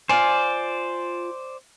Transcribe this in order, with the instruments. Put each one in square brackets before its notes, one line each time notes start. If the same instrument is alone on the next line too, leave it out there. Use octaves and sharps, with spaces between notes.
[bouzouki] F4 G#5 [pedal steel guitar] C5 D5